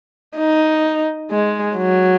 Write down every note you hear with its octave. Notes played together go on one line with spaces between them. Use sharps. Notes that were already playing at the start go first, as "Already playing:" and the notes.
D#4
G#3
F#3